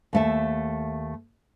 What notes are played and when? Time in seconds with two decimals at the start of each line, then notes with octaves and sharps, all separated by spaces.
0.13 D#2 A3 E5